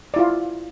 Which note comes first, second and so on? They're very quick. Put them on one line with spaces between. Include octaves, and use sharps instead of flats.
D5 E4 F4